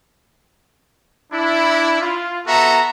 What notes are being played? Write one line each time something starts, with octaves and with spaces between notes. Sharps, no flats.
D4 E4
F4
B3 F#4 A4 E5 A#5